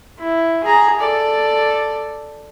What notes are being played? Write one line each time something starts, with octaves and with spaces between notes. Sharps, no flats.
E4
G#4 A#5
A4 D5